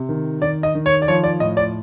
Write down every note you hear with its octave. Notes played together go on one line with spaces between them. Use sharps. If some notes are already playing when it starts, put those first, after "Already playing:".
Already playing: C3
D#3
D#3 D5
D#5
D#3
C#5
D5
F3 C#5
D5
A2 D#5
D5